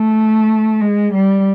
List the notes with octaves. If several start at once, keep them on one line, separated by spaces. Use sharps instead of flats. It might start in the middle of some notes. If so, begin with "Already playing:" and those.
Already playing: A3
G#3
G3